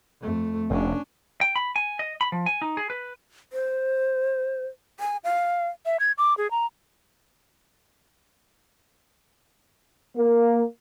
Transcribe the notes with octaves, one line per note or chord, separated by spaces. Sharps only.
F2 A3
F1 C#4 D4
G5
B5
G#5
D#5
B5
F3
G#5
D#4
G#4
B4
C5
G#5
F5
E5
G#6
D6
G#4
A#5
A#3